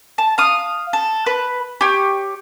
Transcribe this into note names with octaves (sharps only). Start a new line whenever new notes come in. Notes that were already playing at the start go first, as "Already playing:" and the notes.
A5
F5 D#6
A4
B4
G4 C#5